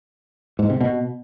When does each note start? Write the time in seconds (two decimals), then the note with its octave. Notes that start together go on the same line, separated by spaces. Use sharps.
0.59 G#2
0.70 C3
0.81 B2